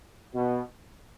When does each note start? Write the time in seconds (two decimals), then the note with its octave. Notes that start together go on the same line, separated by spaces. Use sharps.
0.35 B2